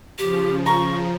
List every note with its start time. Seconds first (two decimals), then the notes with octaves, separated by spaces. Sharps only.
0.18 C#3 F3 G4
0.66 A#5 C#6